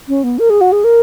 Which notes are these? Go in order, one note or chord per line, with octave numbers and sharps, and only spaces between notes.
C#4
B3
A#4
G#4
F#4
G#4
A#4